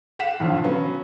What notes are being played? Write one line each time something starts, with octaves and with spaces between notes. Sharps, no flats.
F5 F#5 B6 E7
B1 F2 D3
F#3 B3 C#4